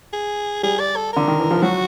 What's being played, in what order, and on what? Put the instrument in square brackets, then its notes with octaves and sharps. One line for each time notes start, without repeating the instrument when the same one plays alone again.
[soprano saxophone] G#4
[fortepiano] G3 [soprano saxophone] G#4
[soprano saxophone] D5
A4
[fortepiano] D3 [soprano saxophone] A#4
[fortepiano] D#3
E3
F3
[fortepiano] F#3 [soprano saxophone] F#4